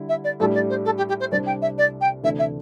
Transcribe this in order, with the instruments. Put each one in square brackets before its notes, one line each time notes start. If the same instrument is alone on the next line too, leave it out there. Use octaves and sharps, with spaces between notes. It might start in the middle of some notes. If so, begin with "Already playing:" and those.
Already playing: [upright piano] D3 G3 E4
[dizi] E5
D5
[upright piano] A2 G3 D4 G4 [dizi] A4
[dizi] D5
C5
A4
G4
G4
C5
[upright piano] C2 C3 G3 D4 C5 [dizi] D5
[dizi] G5
E5
D5
G5
[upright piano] D2 C3 E3 A3 D4 [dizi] E5
[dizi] E5